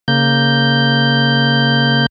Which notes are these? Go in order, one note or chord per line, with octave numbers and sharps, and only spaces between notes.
C#3 A#3 G6